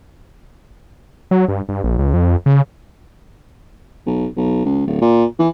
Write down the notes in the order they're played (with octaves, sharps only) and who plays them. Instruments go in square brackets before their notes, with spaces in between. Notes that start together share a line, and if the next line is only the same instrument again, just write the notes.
[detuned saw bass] F#3
G2
G2
A#1
C#2
F2
C#3
[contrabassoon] B1
B1
C#2
D1
A#2
E3